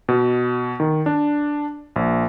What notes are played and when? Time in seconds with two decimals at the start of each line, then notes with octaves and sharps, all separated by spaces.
0.09 B2
0.80 D#3
1.06 D4
1.96 A#1